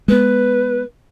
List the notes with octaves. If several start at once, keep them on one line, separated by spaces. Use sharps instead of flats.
G#3 B3 B4